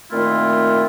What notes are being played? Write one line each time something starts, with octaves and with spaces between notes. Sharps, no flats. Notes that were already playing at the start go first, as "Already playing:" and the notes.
A#2 D#3 A3 C4 E4 F4